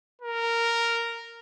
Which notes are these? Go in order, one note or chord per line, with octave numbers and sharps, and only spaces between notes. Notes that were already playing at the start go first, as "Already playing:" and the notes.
A#4